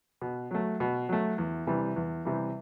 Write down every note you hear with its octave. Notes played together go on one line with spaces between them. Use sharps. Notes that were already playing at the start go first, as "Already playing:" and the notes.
B2
F#3 A3
B2
F#3 A3
E2
C3 E3 G3
E2
C3 E3 G3